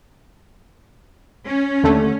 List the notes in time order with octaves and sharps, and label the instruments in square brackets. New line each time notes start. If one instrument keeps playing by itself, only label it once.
[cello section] C#4
[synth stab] D#2 D3 A3